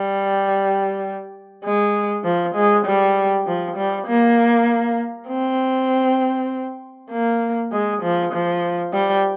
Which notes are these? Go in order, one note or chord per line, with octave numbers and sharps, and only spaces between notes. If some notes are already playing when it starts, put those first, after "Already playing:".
Already playing: G3
G#3
F3
G#3
G3
F3
G3
A#3
C4
A#3
G#3
F3
F3
G3